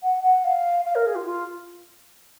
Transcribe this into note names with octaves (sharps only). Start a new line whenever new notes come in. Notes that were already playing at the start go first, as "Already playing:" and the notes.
F#5
F#5
F5
F5
A#4
G#4
F4
F4